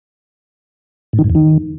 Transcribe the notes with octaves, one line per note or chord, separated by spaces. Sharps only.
A2
D#3
G#2
E2
D#3